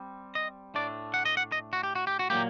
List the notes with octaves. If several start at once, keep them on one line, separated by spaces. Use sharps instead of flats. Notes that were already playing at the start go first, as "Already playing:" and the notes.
Already playing: G3 C4
D#5
A2 A3 D4 D5
F#5
D#5
F#5
D#5
F#4
G4
F#4
G4
F#4
A#2 F#3 A#3 G4